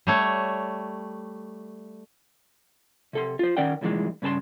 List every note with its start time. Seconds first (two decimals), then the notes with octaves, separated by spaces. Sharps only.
0.07 G3 A3 C#5
3.13 C3 A4 C6
3.39 F4 C5
3.57 D#3 C#4 A#4 D5 F#5 G5
3.81 C2 F2 A#2 D#3 E3 G#3
4.22 G2 C#3 B4 A5 C6